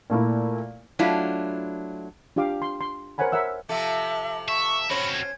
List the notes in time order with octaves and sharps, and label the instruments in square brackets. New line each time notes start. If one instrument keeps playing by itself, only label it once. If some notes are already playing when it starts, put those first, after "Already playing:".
[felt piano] A#2 A3 A#3 E4
[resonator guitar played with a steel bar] F#3 A3 D4 E4 F4
[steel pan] D4 F4 G4 F5 D6
C6
C6
A#4 C5 C#5 F#5 G#5 B5
A#4 C#5 E5 F#5 E6
[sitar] C3 F3 A4 [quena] E5
[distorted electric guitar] E5 [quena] C#6
[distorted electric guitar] C4 F#4 [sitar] C#4 C5 [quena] B5
[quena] G#6